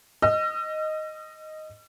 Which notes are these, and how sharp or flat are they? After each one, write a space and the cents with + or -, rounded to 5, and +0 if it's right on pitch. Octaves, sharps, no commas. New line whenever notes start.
D#5 +0 E6 +45